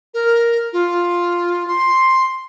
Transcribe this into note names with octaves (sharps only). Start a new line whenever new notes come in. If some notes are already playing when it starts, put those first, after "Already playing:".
A#4
F4
C6